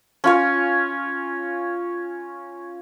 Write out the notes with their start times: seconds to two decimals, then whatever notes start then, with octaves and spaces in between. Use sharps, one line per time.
0.24 C#4 F4 C#5